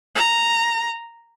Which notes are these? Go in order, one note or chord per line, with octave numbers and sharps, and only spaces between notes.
A#5